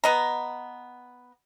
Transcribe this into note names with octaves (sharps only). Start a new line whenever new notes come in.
B3 D#5 A#5